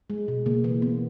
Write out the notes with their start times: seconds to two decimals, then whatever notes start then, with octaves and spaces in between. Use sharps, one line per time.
0.10 G#3
0.28 B2
0.46 C#3 A#3
0.64 E3 A#3
0.82 E3 B3